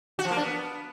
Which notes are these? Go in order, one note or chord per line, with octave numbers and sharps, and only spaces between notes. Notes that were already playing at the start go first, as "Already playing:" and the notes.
F#4
F3
A#3
D4
B3